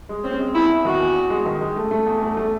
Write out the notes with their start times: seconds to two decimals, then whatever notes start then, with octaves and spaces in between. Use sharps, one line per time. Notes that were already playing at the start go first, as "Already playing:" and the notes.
0.09 G#3
0.24 C4 C#4
0.39 G#3
0.54 E2 E4
0.69 E2
0.85 D#3 F#4
0.99 E2
1.15 E2
1.30 G#3
1.46 D#3
1.61 G#3
1.76 A3
1.91 A3
2.06 E2
2.22 A3
2.37 A3